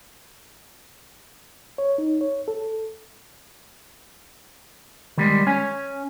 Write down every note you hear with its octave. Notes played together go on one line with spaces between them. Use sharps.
C#5
D#4
C#5
A4
D#3 G3 G#3
C#4 C#5 G#5